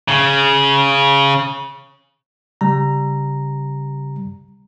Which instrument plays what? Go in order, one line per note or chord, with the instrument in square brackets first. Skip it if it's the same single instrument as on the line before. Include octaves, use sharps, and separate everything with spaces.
[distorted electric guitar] C#3
[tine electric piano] C#3 G3 A#5